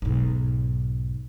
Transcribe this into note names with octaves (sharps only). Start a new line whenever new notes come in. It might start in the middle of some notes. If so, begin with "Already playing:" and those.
B1 G#2